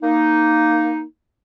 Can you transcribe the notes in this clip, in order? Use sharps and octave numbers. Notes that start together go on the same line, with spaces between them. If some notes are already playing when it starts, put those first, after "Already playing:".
A#3 D#4